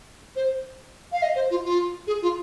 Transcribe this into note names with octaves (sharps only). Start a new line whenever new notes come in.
C5
F5
D#5
C5
F4
F4
G#4
F4